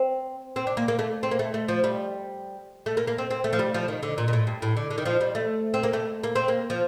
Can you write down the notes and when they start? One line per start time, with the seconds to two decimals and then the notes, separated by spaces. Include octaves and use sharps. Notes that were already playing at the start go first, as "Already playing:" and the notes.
Already playing: C4
0.56 C4
0.67 D4
0.77 A#3
0.88 A#3
0.99 A3
1.23 C4
1.31 A#3
1.39 A3
1.54 A3
1.68 F3
1.84 G3
2.86 A3
2.97 A#3
3.07 A#3
3.18 C4
3.31 C4
3.44 A3
3.53 F3
3.59 G3
3.74 F3
3.88 D#3
4.03 D3
4.18 A#2
4.28 A#2
4.33 A2
4.47 G2
4.62 A2
4.77 D3
4.90 D3
4.98 D#3
5.05 F3
5.21 G3
5.35 A3
5.74 C4
5.83 A#3
5.93 A3
6.24 A#3
6.36 C4
6.48 A#3
6.70 F3